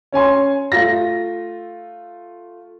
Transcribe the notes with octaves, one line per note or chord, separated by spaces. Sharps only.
C#4 C#5 G#5 C6
A3 F4 A#6